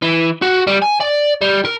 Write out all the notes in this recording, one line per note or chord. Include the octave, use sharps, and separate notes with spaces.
E3
F#4
G3
G#5
D5
G3
A#4